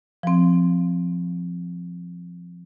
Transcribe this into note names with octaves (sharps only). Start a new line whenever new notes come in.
F3 C4